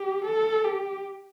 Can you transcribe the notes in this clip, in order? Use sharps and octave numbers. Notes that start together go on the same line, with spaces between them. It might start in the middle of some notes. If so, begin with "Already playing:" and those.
Already playing: G4
A4
G4